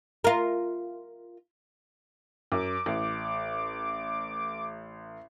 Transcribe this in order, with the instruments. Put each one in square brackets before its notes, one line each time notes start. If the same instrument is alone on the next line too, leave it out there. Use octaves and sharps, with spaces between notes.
[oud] F4 A#4
[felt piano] F#2 [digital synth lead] D6
[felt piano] A1